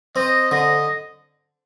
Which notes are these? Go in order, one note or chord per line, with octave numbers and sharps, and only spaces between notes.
C4 D#5
D3 D#5